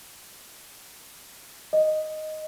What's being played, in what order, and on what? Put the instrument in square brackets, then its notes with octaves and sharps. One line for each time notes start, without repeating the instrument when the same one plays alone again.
[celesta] D#5